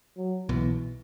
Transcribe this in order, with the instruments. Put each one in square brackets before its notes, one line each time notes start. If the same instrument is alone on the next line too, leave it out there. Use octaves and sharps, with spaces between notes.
[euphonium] F#3
[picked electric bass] B1 B2 [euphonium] E3